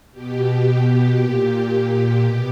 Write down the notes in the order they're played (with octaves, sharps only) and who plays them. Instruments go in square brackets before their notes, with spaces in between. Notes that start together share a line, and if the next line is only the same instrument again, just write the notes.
[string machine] B2 G4
A#2
B2 G4